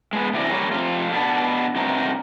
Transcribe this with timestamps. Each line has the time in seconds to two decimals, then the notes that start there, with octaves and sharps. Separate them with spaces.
0.13 G#3 B3
0.33 C3 E3 F#4 D5
0.50 G3 A#3 C#5
0.72 F2 C3 F4
1.11 B2 B3 D4
1.75 G2 C3 C4 D#4 F#4 A#4